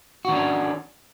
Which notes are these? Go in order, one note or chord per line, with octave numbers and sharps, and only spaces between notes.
D#3 C#4 D4 F#4